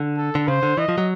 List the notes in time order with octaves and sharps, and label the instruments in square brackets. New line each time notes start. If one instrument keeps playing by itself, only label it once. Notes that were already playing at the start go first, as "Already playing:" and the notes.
Already playing: [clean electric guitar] D3
[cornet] A4
[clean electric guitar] D3
[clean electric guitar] C#3 [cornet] C5
[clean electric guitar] D3
[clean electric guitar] E3 [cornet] D#5
[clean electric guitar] F3
F#3